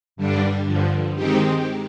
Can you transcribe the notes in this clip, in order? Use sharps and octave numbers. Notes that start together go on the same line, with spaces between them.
G2 D3 G3 D4
G2 D3 F3
D#3 G#3 C4 D#4 G4